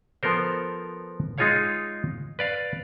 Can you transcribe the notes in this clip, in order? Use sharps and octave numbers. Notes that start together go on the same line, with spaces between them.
F3 B3 A4 A#4 C5
G#3 D#4 F4 G#4 C#5 F5
B4 D5 F5